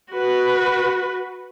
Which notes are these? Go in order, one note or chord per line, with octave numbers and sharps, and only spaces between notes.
F#4 B4